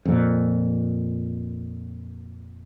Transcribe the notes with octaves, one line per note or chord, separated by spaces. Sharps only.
F2 A#2